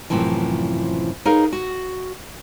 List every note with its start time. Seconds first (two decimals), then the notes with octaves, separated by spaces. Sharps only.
0.10 F#2 A2 C3 E3 F3
1.25 D#4 G#4 A#4 B4 C#5 F5
1.53 F#4